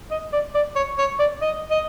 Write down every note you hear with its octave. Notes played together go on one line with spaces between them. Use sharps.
D#5
D5
D5
C#5
C#5
D5
D#5
D#5